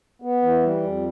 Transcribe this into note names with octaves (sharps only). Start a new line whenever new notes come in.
B3
E3
G3
F2